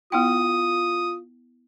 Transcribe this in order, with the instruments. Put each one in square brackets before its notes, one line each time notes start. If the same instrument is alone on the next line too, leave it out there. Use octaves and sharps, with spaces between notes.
[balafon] B3 E4 G5 [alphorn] F4 [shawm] D#6